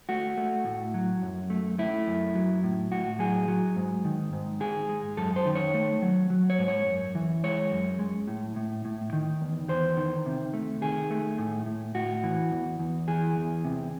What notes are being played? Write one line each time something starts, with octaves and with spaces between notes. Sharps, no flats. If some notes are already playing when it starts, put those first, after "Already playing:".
A3 F#4
A3
A2
F#3
F#2
A3
A3 E4
F#2
F#3
A2
A2 F#4
F#3 G#4
F#3
G#2
D#3
G#2
G#3 G#4
G#3
F#2 A4
C5
D#3
C#5
A3
F#3
F#3
C#5
G#2
C#5
F#2
E3
G#3 C#5
F#2
G#3
A2
A2
A2
D#3
E2
E2 C5
D#3
C3
A3
D#3 G#4
A3
A2
A2
A2 F#4
E3
E2
E2
E3 G#4
E2
C3